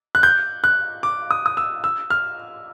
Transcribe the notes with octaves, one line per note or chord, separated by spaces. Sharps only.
F#6
G6
F#6
D6
D#6
D#6
E6
E6
F6